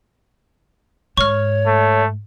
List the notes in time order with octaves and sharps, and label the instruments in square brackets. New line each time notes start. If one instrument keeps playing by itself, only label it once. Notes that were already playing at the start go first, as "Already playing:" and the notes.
[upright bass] G#2 [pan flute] C#5 [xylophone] C#6 F6
[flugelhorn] A3